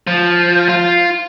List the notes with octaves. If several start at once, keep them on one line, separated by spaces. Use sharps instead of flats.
F3
F4